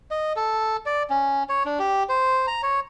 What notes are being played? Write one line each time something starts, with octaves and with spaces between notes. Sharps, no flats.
D#5
A4
D5
C#4
C#5
D4
G4
C5
A#5
C#5